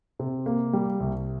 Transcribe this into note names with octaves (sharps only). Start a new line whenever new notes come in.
C3
A#3
G3
C2